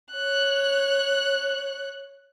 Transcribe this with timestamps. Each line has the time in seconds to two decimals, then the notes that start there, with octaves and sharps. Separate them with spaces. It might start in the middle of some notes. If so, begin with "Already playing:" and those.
0.12 C#5 F#6